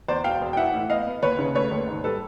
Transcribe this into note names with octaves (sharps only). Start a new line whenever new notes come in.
E2 C5 D5
E1 F5 G5
E1
G5
E3 E5 F#5
A2
B3 D#5 F5
B3
D#2 B4 C#5
C#3
A3 B4 C#5
D#2
G#2
G3 A4 B4